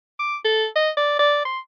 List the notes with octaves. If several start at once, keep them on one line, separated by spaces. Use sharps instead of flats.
D6
A4
D#5
D5
D5
C6